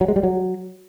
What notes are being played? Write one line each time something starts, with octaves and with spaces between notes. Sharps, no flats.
F#3
G#3
G3
F#3